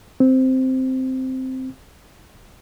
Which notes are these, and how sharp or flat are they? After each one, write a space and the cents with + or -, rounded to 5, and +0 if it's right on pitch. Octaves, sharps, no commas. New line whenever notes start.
C4 -5